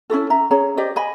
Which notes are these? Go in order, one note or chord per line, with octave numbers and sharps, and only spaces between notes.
C#4 E4 F#4 A4
E5 A#5
C#4 G#4 C#5 A#5
G4 C5 D5 D#5
D#5 G#5 B5